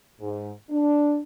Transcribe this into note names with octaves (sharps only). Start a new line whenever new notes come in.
G#2
D4